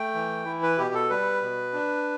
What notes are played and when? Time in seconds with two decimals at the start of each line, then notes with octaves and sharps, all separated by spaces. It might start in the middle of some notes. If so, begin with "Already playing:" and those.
Already playing: A3 G5
0.15 E3
0.45 E4
0.63 B4
0.78 B2 G4
0.94 A4
1.10 G3 B4
1.41 B2
1.74 D4